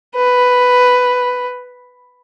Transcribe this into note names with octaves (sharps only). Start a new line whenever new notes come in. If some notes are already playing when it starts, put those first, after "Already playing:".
B4